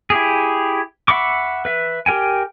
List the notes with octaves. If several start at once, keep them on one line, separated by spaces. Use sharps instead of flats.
E4 G4 G#4
E5 F#5 B5 C#6 D6
B4 E5
G4 A#4 G5 G#5